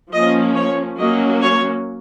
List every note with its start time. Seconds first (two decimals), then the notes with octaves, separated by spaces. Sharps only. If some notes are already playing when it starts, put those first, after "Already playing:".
0.12 F3 A#3 C#4 D#5
0.55 C#5
0.98 F#3 A#3 C#4 D#5
1.42 C#5